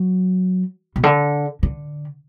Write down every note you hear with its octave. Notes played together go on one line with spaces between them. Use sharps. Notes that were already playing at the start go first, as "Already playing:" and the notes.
Already playing: F#3
B2
D3
D3